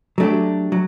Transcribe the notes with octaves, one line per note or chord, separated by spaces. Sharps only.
F#3 A3 D4 G4
F#3